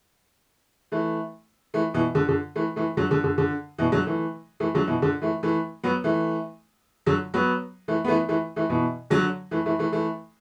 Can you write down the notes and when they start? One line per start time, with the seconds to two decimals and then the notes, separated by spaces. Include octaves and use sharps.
0.92 E3 A3
1.74 E3 A3
1.94 B2 E3
2.15 D3
2.28 D3
2.56 E3 A3
2.76 E3 A3
2.97 D3 F#3
3.11 D3
3.24 D3
3.38 D3
3.78 B2 E3
3.92 D3 F#3
4.07 E3 A3
4.60 E3 A3
4.75 D3 F#3
4.87 B2 E3
5.02 D3
5.22 E3 A3
5.43 E3 A3
5.84 F#3 B3
6.04 E3 A3
7.06 D3 F#3
7.34 F#3 B3
7.88 E3 A3
8.04 B3
8.08 E3 A3
8.29 E3 A3
8.56 E3 A3
8.70 B2 E3
9.10 D3 F#3
9.51 E3 A3
9.66 E3 A3
9.79 E3 A3
9.92 E3 A3